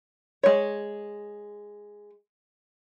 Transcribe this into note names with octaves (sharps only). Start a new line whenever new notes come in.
G#3 C#5